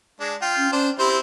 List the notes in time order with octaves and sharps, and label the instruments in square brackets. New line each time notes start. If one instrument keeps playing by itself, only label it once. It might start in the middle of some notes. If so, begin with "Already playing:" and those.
[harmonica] G#3 D4
F4 G5
[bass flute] C#4
[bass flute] C#4 [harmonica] D4 C5
[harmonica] C4 E4 C5 [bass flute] G4